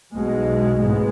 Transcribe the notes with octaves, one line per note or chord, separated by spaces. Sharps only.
B1 B2 G#3
A1 G#2 G#3 B3